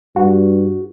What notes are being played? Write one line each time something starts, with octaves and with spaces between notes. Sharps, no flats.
G2 F#4